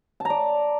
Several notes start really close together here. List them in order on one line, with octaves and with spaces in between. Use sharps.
A5 A#5 D5